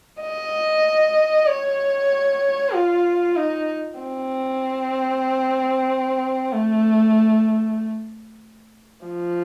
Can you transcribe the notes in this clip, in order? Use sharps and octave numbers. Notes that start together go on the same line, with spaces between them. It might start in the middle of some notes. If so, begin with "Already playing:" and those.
D#5
C#5
F4
D#4
C4
A3
F3